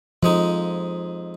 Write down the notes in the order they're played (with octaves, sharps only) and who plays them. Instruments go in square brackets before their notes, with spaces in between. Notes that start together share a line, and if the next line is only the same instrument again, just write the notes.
[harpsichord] F2 G#3 D#4 [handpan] F3